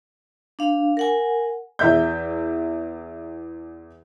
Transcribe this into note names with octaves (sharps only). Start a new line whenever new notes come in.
D4 F5
A#4 F#5 G#5
E2 E5 G6